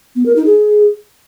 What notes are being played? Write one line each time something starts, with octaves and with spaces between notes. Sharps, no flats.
B3
A#4
D#4
G#4